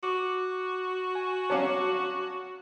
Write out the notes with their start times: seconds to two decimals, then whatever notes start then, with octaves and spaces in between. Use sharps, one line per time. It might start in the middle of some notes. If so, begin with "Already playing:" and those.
0.03 F#4 D6
1.15 G#5
1.50 F#3 C#4 F5 A5 D6 C#7